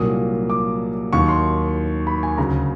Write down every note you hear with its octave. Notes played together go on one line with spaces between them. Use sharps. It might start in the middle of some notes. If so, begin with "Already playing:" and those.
Already playing: C2 A#2 F#3 A#3 D#6
D6
D#2 D#3 F#3 C#6
C6
B5
G#5
D2 C#3 F#3 A#5